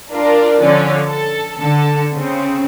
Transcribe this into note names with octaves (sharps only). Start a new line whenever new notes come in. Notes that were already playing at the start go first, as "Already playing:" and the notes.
D4 F4 A#4 D5
D3 F3 C#4 D5
A4
D3 A4
C#3 C4